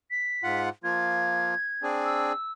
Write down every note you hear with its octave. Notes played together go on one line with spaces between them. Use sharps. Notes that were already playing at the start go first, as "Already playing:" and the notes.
B6
G#2 F4 F#5
F3 A#3 F4 G#6
C4 D4 G#4
E6